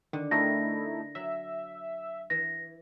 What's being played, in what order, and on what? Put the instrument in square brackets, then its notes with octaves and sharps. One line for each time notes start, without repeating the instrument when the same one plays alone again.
[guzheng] D3 [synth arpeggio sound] D#3
[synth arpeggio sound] A3 D#4 E4 [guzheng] A#4 G5 [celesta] A#6
[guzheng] F#3 [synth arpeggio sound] E5
[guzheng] E3 [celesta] A#6